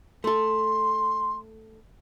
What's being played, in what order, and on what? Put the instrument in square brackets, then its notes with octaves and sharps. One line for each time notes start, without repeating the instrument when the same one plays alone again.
[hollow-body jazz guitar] A3 A4 [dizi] C6